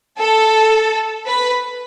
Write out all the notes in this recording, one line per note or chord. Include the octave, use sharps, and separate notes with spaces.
A4
B4